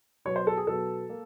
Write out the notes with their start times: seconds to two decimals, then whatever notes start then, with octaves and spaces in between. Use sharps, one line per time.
0.25 B2 F#3 B3 C#5
0.36 C5
0.47 A4
0.57 G#4
0.67 B2 F#3 B3 A4
1.10 A#3